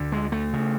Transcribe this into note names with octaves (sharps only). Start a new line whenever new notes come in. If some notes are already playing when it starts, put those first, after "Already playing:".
Already playing: D2 D3
G#3
A3
C#3